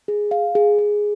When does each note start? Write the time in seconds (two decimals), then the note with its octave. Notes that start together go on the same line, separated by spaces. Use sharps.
0.08 G#4
0.31 F5
0.55 G#4
0.79 G#4